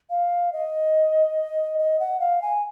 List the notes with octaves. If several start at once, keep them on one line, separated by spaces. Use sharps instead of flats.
F5
D#5
D#5
F#5
F5
G#5